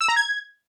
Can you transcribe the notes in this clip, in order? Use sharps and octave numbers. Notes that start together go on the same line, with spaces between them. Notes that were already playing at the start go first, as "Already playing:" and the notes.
E6
A#5
G#6